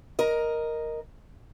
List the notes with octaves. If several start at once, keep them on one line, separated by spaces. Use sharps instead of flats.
A#4 D#5